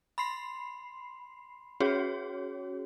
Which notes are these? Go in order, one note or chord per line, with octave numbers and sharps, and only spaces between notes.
B5 C6 C7
C#4 F#4 G#4 C#5